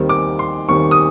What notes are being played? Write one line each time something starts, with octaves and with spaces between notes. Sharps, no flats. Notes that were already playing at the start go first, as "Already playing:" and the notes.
Already playing: D#2 D#3 G3 C4
D6
C6
D#2 D#3 G3 C4 C#6
D#6